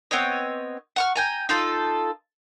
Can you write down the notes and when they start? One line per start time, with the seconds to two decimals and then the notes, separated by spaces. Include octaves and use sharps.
0.11 B3 C4 C#5 D#5
0.96 F#5 C#6 F6
1.16 G5 G#5 A#5
1.49 D#4 F4 A4